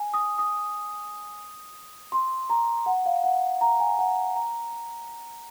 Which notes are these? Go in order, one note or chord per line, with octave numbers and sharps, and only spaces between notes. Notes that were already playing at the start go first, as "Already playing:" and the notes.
Already playing: G#5
D#6
D#6
C6
A#5
F#5
F5
F#5
A#5
G#5
F#5
A#5